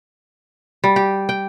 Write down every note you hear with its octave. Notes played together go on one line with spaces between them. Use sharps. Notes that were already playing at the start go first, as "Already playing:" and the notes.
G3
G4
G5